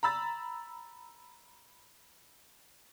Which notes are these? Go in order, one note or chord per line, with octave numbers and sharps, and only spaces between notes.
A#5 B5 E6 A6